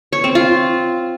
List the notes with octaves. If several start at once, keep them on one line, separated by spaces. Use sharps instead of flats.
C#5
C4
F4